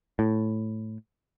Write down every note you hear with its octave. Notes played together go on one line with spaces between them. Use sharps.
A2